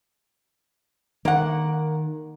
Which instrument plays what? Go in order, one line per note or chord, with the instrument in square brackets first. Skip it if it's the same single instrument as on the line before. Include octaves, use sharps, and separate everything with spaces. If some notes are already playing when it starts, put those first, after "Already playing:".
[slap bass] D#3 [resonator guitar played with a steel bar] A#3 F#5